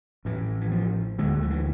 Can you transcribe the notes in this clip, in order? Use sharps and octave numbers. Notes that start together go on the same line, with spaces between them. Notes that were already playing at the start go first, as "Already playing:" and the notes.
A1 A2 E3
E3
F3
D2 D3 G#3
F3
E3